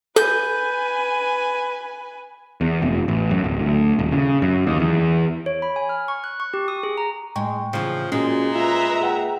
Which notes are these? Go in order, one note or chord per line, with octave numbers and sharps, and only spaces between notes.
A4 B4 G#5 G6
E2
F1
A1
F#2
D1
D2
D#1
C#3
F#2
D#2
E2
C#5
B5
G#5
F6
C#6
F#6
C#6
G4
D#6
G#4
A#5
A2 G#3 G5 C#6
C#3 E3 F3
A#2 G#3 C#4 F#4 G#4
F4 B4 E5 A#5
G#4 F#5 G5